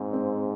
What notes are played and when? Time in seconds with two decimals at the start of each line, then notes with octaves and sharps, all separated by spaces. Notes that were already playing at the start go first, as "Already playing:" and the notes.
Already playing: G#2 C4
0.13 C4